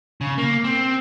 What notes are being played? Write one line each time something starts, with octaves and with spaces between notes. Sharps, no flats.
C#3
A#3
C4